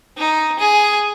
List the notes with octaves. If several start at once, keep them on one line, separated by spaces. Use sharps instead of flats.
D#4
G#4